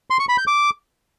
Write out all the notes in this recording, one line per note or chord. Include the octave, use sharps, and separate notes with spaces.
C6
C#6
B5
G6
D6